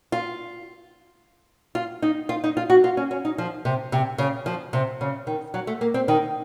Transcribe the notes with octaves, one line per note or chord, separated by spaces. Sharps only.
F4
F4
D#4
F4
D#4
F4
F#4
F4
C#4
C#4
D#4
F3
C3
C3
C#3
F3
C3
C#3
D#3
F#3
A3
A#3
C4
D#3